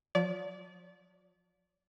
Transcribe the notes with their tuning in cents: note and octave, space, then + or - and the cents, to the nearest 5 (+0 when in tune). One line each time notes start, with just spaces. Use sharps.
F3 +40 D5 -30